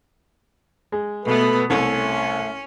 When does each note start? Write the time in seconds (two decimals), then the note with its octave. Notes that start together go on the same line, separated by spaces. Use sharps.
0.92 G#3
1.25 B2 A3 B3 A4 B4
1.70 C2 A3 C#4 A4